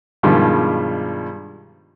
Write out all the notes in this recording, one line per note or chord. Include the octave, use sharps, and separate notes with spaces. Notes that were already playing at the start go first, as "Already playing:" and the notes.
G2 B2 D#3 F3 G3 G#3